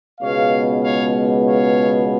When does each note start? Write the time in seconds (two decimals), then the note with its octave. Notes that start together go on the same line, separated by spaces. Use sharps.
0.21 C#2 B2 G#3 B3 C#5 F5
0.84 C#5 F5
1.47 C#5 F5